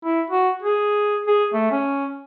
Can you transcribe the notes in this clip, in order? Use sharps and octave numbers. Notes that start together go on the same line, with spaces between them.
E4
F#4
G#4
G#4
A3
C#4